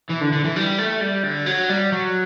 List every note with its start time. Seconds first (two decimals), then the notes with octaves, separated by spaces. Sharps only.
0.10 E3
0.21 D3
0.33 D3
0.44 E3
0.56 G3
0.78 A3
1.01 G3
1.24 D3
1.46 F#3
1.69 G3
1.92 F#3